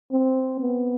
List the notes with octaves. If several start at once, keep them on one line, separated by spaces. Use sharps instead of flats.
C4
B3